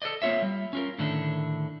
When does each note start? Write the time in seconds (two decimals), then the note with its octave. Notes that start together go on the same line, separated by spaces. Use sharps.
0.02 A4 B4 D5 D#5
0.22 A#3 C4 F4 C#5 E5
0.42 G3
0.73 C#4 F4 A#4
0.98 A2 D3 D#3 A3 D4